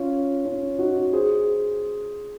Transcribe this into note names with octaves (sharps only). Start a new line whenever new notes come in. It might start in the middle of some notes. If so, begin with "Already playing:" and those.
Already playing: C#4 F4
C#4
D#4 F#4
G#4 C5